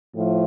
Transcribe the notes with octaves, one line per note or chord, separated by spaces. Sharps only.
A2 F3